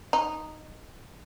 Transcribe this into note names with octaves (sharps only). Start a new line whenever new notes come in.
D#4